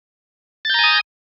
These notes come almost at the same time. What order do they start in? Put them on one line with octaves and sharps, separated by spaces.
A6 G6 A#5 G#5 D#6